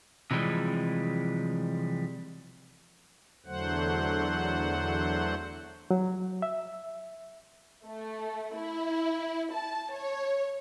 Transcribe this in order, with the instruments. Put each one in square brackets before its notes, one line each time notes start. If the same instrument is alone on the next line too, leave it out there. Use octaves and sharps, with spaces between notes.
[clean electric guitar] C3 E3 F3 G3 G#3
[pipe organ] E2 D3 F#3 A3 C5 F#5
[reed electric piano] F#3
E5
[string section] A3
E4
A5
C#5